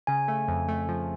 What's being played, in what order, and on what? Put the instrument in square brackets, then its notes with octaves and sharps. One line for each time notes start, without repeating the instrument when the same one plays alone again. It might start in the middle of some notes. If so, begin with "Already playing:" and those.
[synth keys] C#3 [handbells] G#5
[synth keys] A3
F2
A3
F3